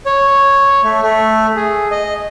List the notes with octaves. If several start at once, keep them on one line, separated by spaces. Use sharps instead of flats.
C#5
A3
A3
G#4
D#5